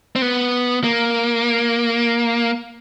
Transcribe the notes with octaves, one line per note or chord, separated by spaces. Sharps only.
C4
B3
A#3